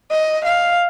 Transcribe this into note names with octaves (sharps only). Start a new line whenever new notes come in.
D#5
F5